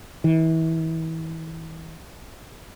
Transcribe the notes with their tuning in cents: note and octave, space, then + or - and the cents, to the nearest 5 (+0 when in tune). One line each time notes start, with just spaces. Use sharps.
E3 -30